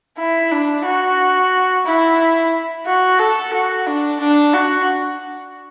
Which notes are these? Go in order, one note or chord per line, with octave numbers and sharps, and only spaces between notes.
E4
D4
F#4
E4
F#4
A4
F#4
D4
D4
F#4